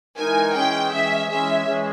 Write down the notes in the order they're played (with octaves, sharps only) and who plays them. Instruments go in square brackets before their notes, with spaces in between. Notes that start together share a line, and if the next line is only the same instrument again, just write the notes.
[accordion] E3 G#3 D#4 A#4 [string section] G#5
[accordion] E3 G#3 C#4 G#4 [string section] G5
[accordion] E3 G#3 C#4 G#4 [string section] E5
[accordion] E3 G#3 C#4 G#4 [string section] E5
[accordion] E3 G#3 C#4 G#4